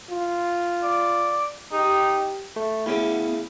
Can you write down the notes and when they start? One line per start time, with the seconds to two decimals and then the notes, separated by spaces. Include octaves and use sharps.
0.11 F4
0.83 D5
1.72 D#4 G4
2.56 A3
2.86 D2 C#3 B3 E4